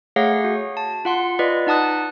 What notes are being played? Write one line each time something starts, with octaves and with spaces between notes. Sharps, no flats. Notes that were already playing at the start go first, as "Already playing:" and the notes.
A3 G#4 C#5 F5 F#5 A#6
F#4
A5
F4 F#5 C6
F4 B4 D5 D#5
D#4 F#5 A5 D#6 F#6